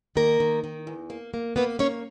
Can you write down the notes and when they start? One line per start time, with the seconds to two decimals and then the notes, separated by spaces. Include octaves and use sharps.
0.15 D#3 A#3 A#4
0.40 D#3
0.64 D#3
0.87 E2
1.10 A#3
1.34 A#3
1.56 A#3 B3 B4
1.79 A#3 C#4 C#5